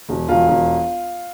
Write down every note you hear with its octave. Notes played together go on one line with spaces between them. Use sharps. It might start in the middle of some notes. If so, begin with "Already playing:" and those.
E1
E1 F4
E1